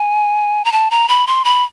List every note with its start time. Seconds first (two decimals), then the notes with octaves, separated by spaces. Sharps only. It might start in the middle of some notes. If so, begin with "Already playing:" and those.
Already playing: G#5
0.65 A#5
0.72 A5
0.91 A#5
1.08 B5
1.27 C6
1.45 B5